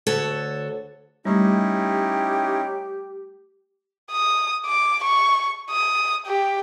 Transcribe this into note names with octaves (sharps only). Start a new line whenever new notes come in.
D2 F#4 A4 C#5
G3 A3 C#4 D#4 E4 G4
D#6
D6
C#6
D#6
G4